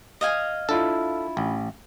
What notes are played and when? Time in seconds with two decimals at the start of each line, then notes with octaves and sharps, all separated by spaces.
0.21 D#5 F5 G#5
0.69 D4 E4 F4 A4
1.37 A1